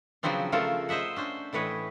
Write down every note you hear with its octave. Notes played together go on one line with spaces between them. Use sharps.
C#3 F3 F#3 B3 C4 D4
C#3 F3 A3 F4 A4 A#4
C5 D#5 E5 F#5
C#4 D4 C5
A2 E3 B4 C#5 D#5